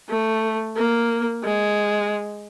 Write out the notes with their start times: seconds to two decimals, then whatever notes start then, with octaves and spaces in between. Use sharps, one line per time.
0.09 A3
0.76 A#3
1.43 G#3